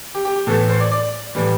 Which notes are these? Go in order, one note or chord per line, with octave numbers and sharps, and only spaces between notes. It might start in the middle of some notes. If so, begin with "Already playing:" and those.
G4
G4
G4
A2 E3 A3 A4
C5
D5
D5
A2 E3 G3